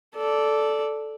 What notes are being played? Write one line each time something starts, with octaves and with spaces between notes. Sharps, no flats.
A4 D5